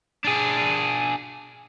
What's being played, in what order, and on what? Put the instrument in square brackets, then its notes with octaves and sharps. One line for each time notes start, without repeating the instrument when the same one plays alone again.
[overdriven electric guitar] D4 G#4